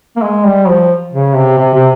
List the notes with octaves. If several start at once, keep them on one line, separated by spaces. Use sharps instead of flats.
A#3
G#3
G3
F3
C#3
C3
C3
C3